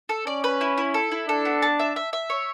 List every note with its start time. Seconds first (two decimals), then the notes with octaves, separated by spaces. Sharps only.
0.09 A4
0.27 C#4 D5
0.44 B4
0.61 E4
0.78 E4
0.94 A4
1.12 E4
1.28 D4 A4
1.45 B3
1.62 A5
1.79 E5
1.96 E5
2.13 E5
2.30 C#5